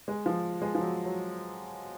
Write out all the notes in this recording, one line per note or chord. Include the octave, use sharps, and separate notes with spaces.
G#3
F3
G#3
F3
F#3
F#3